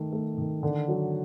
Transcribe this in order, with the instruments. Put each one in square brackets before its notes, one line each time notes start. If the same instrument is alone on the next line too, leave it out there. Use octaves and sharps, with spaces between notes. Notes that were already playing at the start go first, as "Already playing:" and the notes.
Already playing: [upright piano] D#3 A3
A3
D#3
D3
F#3